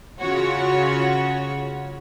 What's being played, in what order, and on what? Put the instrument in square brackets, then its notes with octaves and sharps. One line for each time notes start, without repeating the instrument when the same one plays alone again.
[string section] C#3 F4 F#4 C#5